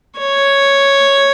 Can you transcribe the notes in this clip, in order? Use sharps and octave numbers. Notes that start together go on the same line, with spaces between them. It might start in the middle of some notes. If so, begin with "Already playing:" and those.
C#5